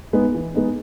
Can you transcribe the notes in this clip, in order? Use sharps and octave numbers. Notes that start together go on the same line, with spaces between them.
G#3 B3 D#4
E3
G#3 B3 D#4